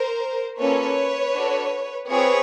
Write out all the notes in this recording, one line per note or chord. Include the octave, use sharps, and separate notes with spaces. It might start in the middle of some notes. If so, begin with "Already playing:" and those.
Already playing: A#4 C5
A#3 C#4 F4 A4 B4 C#5
D4 F#4 A4
C4 F4 G#4 B4 C#5